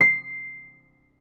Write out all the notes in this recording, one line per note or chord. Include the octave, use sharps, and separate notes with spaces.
C7